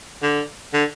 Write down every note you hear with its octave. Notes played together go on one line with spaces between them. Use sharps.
D3
D3